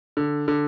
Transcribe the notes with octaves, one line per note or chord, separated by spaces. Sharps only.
D3
D3